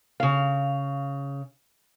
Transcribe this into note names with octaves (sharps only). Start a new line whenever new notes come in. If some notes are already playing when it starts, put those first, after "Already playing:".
C#3 F5